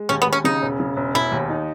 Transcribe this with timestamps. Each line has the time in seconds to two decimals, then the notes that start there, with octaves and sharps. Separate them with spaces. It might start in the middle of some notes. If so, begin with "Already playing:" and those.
Already playing: G#3
0.09 D#2 C#4
0.22 B3
0.27 D#2
0.33 C#4
0.44 C#3 D#4
0.62 E1
0.80 C#3
0.97 E1
1.14 E1 E4
1.32 D#2
1.49 D#4